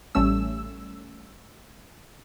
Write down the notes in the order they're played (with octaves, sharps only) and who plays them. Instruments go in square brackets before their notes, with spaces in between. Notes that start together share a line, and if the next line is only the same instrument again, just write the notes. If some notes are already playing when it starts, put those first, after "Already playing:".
[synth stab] A1 G3 A3 C#4 E6